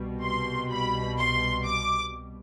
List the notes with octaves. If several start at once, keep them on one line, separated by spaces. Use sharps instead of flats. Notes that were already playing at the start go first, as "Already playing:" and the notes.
Already playing: C2 B2 G3
C6
B5
C6
D6